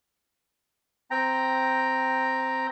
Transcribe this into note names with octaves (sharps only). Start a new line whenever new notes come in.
C4 G5 A#5